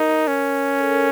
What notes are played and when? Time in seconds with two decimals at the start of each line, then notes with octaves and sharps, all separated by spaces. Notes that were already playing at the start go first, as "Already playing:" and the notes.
Already playing: D#4 A#4
0.28 C#4
0.80 A4
0.89 A#4